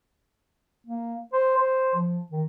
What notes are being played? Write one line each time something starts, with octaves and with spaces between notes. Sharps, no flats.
A#3
C5
C5
F3
D#3